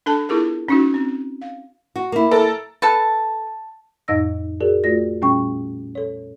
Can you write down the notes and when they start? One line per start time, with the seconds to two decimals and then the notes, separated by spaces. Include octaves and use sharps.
0.06 D4 A4 A5
0.29 B3 E4 F4 G4 G#4 A#4
0.68 C#4 D#4 F#4
0.94 C4
1.42 F5
1.96 F#4
2.12 A#3 E4
2.31 A4 A#4
2.82 A4 B4 A5
4.08 F2 A2 D#4 D#5 E6 A#6
4.61 F#4 G#4 A#4 D5
4.84 A3 F4 F#4 D5 A#6
5.22 A#2 G3 C#4 G5 C#6
5.95 A4 C#5